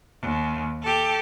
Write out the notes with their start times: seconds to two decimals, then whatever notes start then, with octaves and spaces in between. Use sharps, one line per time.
0.22 D#2
0.83 G4 A4